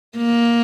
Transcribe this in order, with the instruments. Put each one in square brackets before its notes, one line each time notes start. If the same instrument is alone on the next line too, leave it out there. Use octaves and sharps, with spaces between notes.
[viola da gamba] A#3